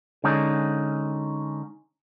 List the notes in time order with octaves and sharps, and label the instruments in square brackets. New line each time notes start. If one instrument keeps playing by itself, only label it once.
[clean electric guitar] D3 G#3 C#4 D#4